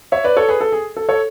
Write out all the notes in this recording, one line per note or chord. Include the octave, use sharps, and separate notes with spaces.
C#5 E5
B4 D5
A4 C#5
G#4 B4
A4
G#4
A4
A4 C#5